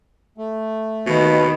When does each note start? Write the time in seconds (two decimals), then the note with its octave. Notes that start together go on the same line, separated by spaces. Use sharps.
0.38 A3
1.07 D#2 B2 D#3 B4